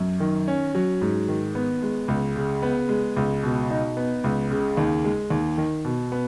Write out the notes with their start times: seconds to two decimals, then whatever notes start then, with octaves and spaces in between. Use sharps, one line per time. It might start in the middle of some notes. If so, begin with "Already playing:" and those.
Already playing: F#2
0.20 D#3
0.48 C#4
0.75 F#3
1.01 G#2
1.28 D#3
1.55 B3
1.82 G#3
2.08 C#2
2.36 C#3
2.62 B3
2.89 G#3
3.16 C#2
3.43 B2
3.70 D#4
3.97 B3
4.24 C#2
4.51 C#3
4.77 D#2
5.04 G#3
5.30 D#2
5.58 D#3
5.85 B2
6.12 B3